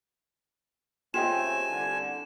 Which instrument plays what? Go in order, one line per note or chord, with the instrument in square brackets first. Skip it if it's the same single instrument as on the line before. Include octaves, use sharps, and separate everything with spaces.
[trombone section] C#3 A3 C4 [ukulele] F4 G4 D#5 [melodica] G#5 [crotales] E7
[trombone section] C2 D3